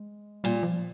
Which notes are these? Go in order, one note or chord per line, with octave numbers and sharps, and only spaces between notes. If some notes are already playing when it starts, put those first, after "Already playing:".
Already playing: G#3
A#2 G3
F3